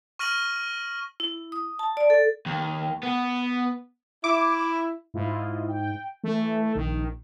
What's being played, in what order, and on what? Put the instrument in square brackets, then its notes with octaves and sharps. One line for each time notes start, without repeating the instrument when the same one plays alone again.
[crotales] C#6 F6 A#6 D#7 F#7
[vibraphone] E4
D#6
A5
D5
A4
[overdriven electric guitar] D#2
B3
[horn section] E4 [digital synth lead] D6
[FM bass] G#2 [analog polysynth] E4 F4 D#5
[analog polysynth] G5
[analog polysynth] E3 [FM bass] A3
[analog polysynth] A#1 [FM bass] D#3